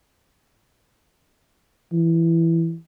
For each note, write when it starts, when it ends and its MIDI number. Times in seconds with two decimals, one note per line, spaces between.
1.93 2.76 52